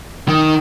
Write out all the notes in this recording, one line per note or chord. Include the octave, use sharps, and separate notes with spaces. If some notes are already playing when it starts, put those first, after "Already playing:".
D#3